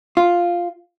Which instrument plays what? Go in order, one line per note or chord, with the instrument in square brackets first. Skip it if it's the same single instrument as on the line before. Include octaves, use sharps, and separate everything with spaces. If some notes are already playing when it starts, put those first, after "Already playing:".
[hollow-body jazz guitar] F4